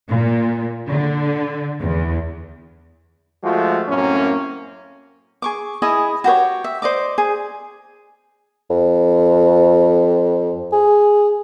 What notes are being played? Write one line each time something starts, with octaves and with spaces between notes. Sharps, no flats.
A#2
D3
E2
F3 G#3 A3 F4 F#4
F#2 A2 A#3 C4 C#4
G#4 C#6 D6
E4 G#4 D#5 G#5
F#4 G4 B4 C#5
E5
C5 D5 D#5 D6
G#4
F2
G#4